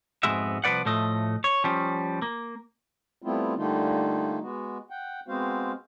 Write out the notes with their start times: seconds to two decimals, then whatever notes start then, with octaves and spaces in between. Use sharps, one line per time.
0.23 F2 G#2 G#3 B3 F#4 E5
0.64 C2 F3 A3 B4 D5 F#5
0.85 A2 F3 A3 D#5
1.44 C#5
1.64 F3 G3 C#4
2.22 A#3
3.22 G3 A3 B3 C4 E4 F4
3.57 D3 G3 A3 A#3 D#4 F4
4.42 G#3 B3 F#4
4.90 F#5 G5
5.28 G#3 B3 C4 F#4 C5 F5